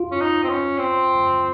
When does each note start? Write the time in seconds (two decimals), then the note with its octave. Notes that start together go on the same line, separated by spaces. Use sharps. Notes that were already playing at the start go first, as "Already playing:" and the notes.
Already playing: F4
0.11 C#4
0.21 D#4
0.44 C4
0.49 C#4
0.78 C4